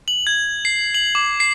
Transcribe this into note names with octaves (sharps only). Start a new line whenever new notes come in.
F#7
G#6
C7
F#7
D6
C7